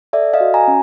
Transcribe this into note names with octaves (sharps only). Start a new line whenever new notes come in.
A4 D5 E5
D#5 F5
F#4
G#5 A#5
C#4